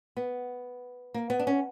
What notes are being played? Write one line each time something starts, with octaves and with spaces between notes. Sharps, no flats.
B3
A#3
B3
D4
C#4